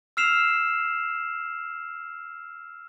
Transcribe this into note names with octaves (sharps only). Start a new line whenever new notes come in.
E6 F6 C7 E7 F7